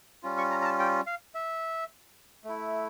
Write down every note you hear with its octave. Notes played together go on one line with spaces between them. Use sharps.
G3 C#4 F4
C#6
A#5
A#5
A5
G5
F5
E5
A3 E4